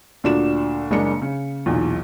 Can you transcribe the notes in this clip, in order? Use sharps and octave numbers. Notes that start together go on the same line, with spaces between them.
D2 A#2 D4 F#4 E7
F#1 G#3 A#3 D4 C#7
C#3
B1 E2 A#2